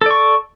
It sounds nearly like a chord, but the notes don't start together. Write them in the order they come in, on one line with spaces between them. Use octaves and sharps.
A4 D5 C#6